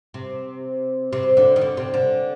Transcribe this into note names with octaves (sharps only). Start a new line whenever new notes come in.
C3
C3
D3
D#3
D3
C3
D3